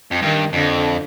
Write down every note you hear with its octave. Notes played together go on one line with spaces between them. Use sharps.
F2
G2 D#3
F2 D3